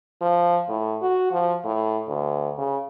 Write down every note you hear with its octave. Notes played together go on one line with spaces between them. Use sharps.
F3
A2
F#4
F3
A2
D2
C#3